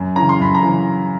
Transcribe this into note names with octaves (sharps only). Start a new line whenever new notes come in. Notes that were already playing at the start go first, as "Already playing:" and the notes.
Already playing: F#2
C#3 E3 A#5
C6
F#2 B5
A#5
C#3 E3